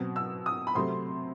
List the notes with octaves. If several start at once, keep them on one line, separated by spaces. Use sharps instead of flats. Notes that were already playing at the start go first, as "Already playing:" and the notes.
Already playing: B2 F#3 C4
E6
D#6
B5
C3 F#3 A3 C4 C6